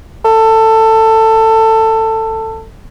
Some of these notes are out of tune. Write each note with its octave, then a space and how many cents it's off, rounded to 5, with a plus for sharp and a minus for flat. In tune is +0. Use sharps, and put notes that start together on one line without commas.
A4 +15